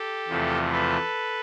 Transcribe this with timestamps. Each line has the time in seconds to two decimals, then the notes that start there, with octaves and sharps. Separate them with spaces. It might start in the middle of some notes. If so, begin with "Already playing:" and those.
Already playing: G4 A4
0.28 E2 C3 F3 A3
0.72 A4 B4